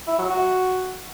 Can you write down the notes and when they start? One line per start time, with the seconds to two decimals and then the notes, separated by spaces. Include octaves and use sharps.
0.08 E4
0.19 F#3
0.30 F#4